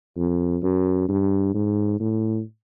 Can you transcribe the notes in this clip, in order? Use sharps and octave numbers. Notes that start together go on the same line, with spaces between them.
F2
F#2
G2
G#2
A2